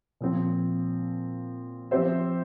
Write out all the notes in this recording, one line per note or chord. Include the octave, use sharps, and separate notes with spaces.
A#2 F3 C4
F3 C4 G4 C5 E5